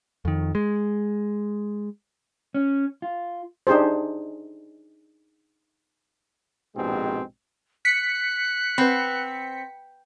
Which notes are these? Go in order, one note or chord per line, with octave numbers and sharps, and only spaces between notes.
F2 D#3
G#3
C#4
F4
D4 D#4 G4 G#4 C5
A#1 G#2 B2 G#3 C4 G4
F#6 B6 C#7
C4 B4 F#5 B5